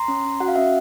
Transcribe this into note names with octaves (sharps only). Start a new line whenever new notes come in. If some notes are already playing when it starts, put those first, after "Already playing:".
Already playing: A#5 C6
C#4
C#4
F#4 F#5
F5
C#4 E5 F#5